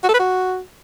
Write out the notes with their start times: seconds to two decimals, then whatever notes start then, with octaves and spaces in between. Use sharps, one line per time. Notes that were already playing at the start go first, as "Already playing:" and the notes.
0.04 F#4
0.09 A4
0.14 B4
0.19 F#4